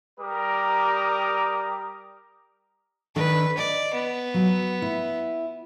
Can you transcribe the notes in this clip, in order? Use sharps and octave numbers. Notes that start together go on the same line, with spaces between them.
G3 A#4 A#5 D6 D#6
D#3 D4 A4 B4
D5 D#5
B3
F#3
E4